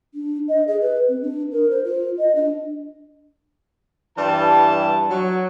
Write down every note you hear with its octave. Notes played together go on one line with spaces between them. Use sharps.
D4
D#5
G#4
B4
C4
D4
A#4
C5
F4
D#5
D4
G2 E3 G3 A5
F#3